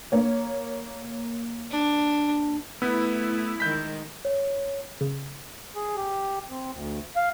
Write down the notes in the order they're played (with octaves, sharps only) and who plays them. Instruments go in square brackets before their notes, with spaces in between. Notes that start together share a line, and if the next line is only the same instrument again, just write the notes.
[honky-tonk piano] A#3 C#5
[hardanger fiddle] D4
[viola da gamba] A3 [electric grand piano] B3 [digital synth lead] E4
[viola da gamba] D#3 G#3 [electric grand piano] G6 B6
[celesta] C#5
[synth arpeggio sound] C#3
[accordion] G#4
G4
C4
D2
F5